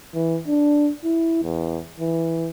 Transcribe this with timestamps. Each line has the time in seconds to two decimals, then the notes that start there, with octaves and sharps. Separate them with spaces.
0.14 E3
0.48 D4
1.04 E4
1.43 E2
2.00 E3